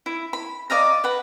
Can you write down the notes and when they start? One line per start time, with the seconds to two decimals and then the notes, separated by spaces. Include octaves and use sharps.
0.06 E4
0.33 B5
0.70 D5 D#5 F5 A#5
1.04 B4 F#5